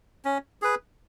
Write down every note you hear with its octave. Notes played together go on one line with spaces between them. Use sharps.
C#4
G#4 B4